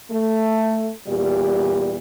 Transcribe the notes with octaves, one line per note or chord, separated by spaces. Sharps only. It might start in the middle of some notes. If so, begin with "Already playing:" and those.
A3
E2 A#2 G3 G4 D5